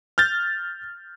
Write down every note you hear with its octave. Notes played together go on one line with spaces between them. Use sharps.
F6 G6 A6